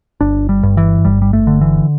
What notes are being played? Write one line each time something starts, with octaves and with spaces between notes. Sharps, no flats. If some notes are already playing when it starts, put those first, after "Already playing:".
G1 D4
G3
G2
E3
G1 G3
G3
A3
D3
E3